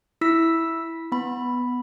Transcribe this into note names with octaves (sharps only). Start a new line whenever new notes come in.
E4 E6 B6
B3 B5